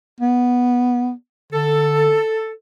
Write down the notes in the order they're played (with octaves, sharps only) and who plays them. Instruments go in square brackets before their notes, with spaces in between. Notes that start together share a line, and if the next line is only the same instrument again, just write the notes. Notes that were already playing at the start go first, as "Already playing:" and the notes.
[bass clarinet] B3
[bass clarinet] D3 [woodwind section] A4